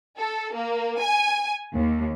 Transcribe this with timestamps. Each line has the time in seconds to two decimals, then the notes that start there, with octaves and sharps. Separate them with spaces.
0.18 A4
0.55 A#3
0.99 G#5
1.74 D#2